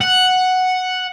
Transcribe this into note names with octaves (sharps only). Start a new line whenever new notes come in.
F#5